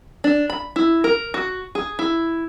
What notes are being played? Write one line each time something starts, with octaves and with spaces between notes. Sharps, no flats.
D4
B5
E4
A#4
F#4
G#4
E4